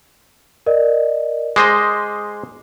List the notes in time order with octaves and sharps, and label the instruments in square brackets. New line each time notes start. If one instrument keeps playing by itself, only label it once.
[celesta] A#4 D5 D#5
[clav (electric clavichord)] G#3 C5 D#5 [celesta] D6 D#6